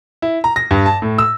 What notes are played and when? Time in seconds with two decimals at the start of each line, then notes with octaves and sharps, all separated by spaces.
0.22 E4
0.44 A#5
0.56 A#6
0.71 G2
0.86 A5
1.02 A2
1.18 E6